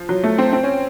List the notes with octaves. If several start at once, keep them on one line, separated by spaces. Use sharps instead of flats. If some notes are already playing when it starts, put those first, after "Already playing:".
Already playing: F3
F#3
A3
C4
C4
C#4